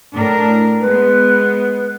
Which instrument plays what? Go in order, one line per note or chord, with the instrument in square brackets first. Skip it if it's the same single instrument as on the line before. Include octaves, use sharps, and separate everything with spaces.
[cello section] A2 D4 A#4
[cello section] G#3 B3 [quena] B4